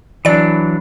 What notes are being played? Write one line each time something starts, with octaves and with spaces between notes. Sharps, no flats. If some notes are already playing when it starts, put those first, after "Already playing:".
E3 F#3 D4 D5 D7